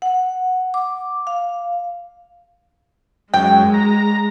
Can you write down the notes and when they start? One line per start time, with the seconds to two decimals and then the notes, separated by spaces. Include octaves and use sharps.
0.02 F#5
0.74 D6
1.27 F5
3.34 F#2 G#3 G5
3.74 A#5